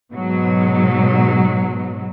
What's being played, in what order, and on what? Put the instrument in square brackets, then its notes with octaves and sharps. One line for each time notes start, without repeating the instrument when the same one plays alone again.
[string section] G#2 B2 F#3